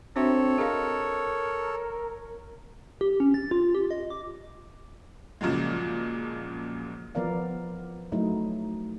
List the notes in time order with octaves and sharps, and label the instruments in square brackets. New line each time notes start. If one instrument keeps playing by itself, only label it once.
[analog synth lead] C4 [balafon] D4 F#4 E5 [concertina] A4 C#5
[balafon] G#4 D#5 F5 [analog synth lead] A#4
[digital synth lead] G4
C#4
A6
F4
G4
D#5
D6
[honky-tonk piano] A#2 C#3 F3 F#3 G#3
[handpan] E3 F3 B3 A#4 D5 F5
F#3 A3 D#4 E4